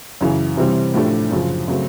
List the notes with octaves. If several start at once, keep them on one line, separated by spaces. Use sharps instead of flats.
F#2 C#3 E3
C3 E3 G3 C4
A2 F3 A3 D4 G4
F#2 C#3 F3
C#3 F#3 A3 C4